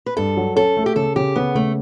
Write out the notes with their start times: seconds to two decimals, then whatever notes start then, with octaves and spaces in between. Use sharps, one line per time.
0.06 B4
0.17 G2 A4
0.37 F#3
0.56 C#4 A4
0.77 A3
0.86 G4
0.96 C#3 A4
1.16 C#3 G4
1.36 C#3 B3
1.55 C#3 A3